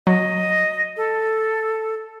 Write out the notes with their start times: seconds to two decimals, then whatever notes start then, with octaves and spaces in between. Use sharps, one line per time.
0.07 F#3 D#5
0.97 A4